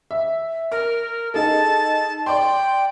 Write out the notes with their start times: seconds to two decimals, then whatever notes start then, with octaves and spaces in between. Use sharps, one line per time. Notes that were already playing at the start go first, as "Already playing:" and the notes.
0.11 E5
0.72 A#4 F6
1.34 D#4 G#4 A4 A5
2.26 D5 G5 C6